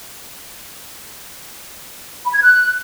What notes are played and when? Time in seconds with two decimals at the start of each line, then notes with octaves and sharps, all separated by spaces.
2.26 B5
2.34 G#6
2.42 F#6